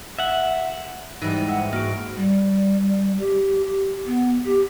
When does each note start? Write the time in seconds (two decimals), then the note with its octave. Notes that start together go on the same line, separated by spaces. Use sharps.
0.19 E5 F#5
1.22 G#2 E3 G3 D#4
1.48 E5 F#5
1.73 A#3 F#4 D7
2.17 G3
3.19 G4
3.64 G4
4.06 B3
4.45 G4